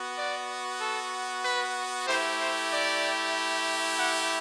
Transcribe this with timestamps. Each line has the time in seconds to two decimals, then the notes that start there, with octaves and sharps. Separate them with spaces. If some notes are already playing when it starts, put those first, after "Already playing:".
Already playing: B3 F#4
0.17 D5
0.81 A4
1.44 B4
2.07 A3 E4 G4 C5
2.40 C5
2.72 D5
3.98 F#5